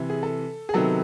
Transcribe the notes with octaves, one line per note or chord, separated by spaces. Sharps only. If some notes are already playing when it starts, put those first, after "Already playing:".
Already playing: C3 E3
G#4
A4
G#4
C3 D#3 F#3 B3 A4